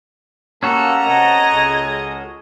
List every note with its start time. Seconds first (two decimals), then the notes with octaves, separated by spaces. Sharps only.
0.63 A3 A#3 C#4 F#4 G4 A4 A#5
1.06 C3 D#5 F#5 A5 G#6
1.52 C#2 G#3